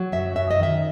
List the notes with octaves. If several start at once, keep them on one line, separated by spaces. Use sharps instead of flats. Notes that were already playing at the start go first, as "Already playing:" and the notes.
Already playing: F#3
F#2 E5
F#2 E5
D#5
D#3 E5